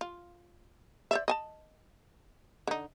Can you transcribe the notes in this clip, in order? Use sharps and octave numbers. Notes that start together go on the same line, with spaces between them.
F4
C5 D5 E5
D#5 G#5 A5
D3 D#4